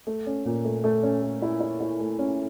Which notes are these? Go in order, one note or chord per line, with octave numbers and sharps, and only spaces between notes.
A3
C#4
A#2
A3
A3
C#4
A3
E4
E4
E4
A3
C#4